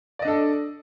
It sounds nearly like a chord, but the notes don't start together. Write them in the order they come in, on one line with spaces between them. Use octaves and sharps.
D5 D#5 D4 A4